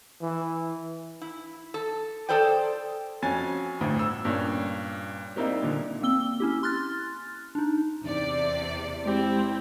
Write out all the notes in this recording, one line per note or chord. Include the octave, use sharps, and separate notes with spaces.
E3
E4
A4
G#4 A4 C5 D5 G5
F2 C#4 F#4 G#5 A6
G1 D2 A2
E6
G2 A#2 C#4
G3 A#3 C4 D#4 E4
A#2 D3
A#3 C4 E6 G7
C#4 E4 G4
C6 F6 F#6 A6
D4 D#4
E2 C3 D5
G#3 C4 E4 G4